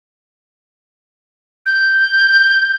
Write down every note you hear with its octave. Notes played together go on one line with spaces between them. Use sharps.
G6